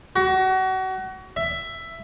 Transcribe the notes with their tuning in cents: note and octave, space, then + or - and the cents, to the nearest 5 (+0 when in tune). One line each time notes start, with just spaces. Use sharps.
F#4 +30
E5 +10